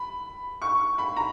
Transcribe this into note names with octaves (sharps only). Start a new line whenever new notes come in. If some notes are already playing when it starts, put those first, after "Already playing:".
Already playing: B5
C#6
B5
A#5